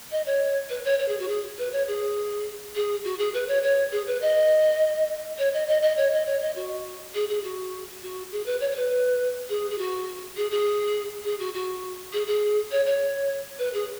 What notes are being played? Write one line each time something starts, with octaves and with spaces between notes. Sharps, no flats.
D#5
C#5
B4
C#5
C#5
G#4
F#4
G#4
B4
C#5
G#4
G#4
F#4
G#4
B4
C#5
C#5
G#4
B4
D#5
C#5
D#5
D#5
D#5
C#5
D#5
C#5
D#5
F#4
G#4
G#4
F#4
F#4
G#4
B4
C#5
C#5
B4
G#4
G#4
F#4
G#4
G#4
G#4
F#4
F#4
G#4
G#4
C#5
C#5
B4
G#4